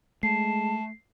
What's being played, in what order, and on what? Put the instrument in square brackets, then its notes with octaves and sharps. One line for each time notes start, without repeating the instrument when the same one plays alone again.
[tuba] G#3 [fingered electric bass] A3 [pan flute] A5 [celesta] C7